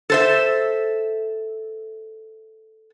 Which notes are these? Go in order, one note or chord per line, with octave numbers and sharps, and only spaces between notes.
A4 C5 E5